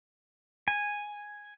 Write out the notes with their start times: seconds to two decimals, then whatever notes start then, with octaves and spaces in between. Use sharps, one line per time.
0.68 G#5